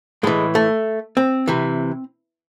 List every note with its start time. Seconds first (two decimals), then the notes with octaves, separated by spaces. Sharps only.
0.23 A2 E3 G#3
0.55 A3
1.17 C4
1.48 C3 E3